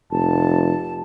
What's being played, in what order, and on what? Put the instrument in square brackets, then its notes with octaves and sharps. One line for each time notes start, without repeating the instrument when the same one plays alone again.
[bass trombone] F1 [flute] A5